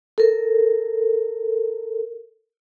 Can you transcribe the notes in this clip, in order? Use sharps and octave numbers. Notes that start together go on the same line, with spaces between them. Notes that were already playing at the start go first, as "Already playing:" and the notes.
A4 A#4